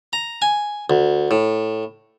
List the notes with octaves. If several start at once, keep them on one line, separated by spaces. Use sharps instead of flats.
A#5
G#5
D2
A2